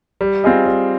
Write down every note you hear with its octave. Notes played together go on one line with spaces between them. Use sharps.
G3
C4 F4 G#4 D#5
G3